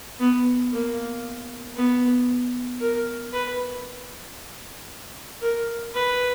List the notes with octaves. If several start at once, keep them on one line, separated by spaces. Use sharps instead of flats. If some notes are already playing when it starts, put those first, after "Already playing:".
B3
A#3
B3
A#4
B4
A#4
B4